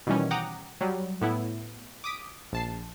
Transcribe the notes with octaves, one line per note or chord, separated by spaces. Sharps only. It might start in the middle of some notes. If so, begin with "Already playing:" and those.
B2 D#3 E3 G3 C#4
F#5 G5 A#5 D6 D#6
F#3 G3
A2 B3 E4
D6 D#6 B6 D7
A#1 A5 C7